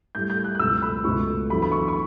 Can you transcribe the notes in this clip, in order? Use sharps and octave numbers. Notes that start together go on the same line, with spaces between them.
A2 G3 G6
G6
F#6
F#6
C#2 B2 F#3 A3 E6
B5
C#2 B2 A3 C#6
E2 D3 F#3 A3 B5
B5
C#6
C#6